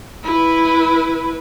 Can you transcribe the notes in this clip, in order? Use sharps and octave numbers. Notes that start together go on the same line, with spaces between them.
E4 B4